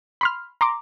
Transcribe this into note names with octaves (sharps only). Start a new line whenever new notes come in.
B5 C6 F6
A#5 C6 D6